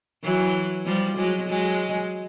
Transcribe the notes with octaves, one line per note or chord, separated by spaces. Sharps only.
E3 F#3
F3 G3
F#3 G#3
F#3 G#3